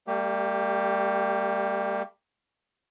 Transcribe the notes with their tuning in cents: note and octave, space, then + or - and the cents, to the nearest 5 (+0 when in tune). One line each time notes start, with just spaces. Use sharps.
G3 +30 A#3 -40 G4 +0